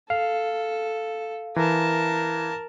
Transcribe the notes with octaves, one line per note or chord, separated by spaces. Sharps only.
A4 F5
E3 A#4 A5